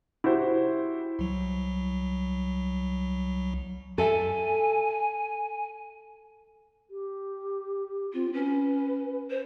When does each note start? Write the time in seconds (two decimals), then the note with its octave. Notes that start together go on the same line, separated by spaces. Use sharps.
0.24 E4 F#4 G4 C5
1.19 C2 F#3
3.98 A4 E5 G#5
6.90 G4
8.13 C4 F4
8.33 C#4 B4
9.31 C5